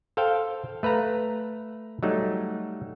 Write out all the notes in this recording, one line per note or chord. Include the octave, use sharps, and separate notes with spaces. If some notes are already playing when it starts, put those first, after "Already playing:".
A4 C5 F5 G5
A3 B4 F5 A#5
F#3 G3 A3 D#4